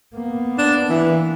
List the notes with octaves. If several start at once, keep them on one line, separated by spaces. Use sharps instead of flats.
A#3 B3
D4
E3